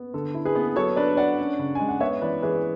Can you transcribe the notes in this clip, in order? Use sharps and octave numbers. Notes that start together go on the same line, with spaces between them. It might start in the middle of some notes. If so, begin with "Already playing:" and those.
Already playing: B3
D3 A4
E4
G#4 B4
B3
F#3 A4 C#5
D4 B4 D5
D4 D5 F#5
C#4
C#3
G#3 G#5
F#5
B3 C#5 E5
E3 B4 D5
E3 G#4 B4